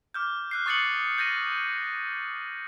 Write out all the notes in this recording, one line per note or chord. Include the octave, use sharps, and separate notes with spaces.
D6 F6 G6
F6 F#6 C7
C#6 D#6 A6 C7 C#7 F#7
G6 A6 A#6 D#7